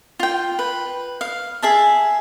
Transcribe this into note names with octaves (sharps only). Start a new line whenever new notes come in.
F4 G5
B4
F5
G#4 E5 A5